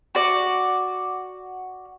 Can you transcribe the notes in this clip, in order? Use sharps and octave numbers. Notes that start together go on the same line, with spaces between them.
F#4 D5